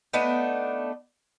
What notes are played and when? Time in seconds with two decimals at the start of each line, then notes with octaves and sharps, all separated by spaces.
0.13 A3 B3 D4 D#4